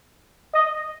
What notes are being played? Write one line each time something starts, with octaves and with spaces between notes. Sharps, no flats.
D#5